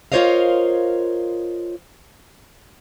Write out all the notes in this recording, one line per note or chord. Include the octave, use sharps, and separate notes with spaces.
F4 A#4 C5 C#5 D#5 F5